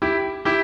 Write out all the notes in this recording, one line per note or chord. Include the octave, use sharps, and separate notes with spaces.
E4 G4
E4 G4